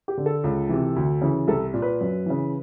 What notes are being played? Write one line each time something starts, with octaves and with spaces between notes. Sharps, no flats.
G4
D3
A4
C#2
C3 E3
D2
C#3 E3
C2 A4
A#2
B4
F#2
C#3 E3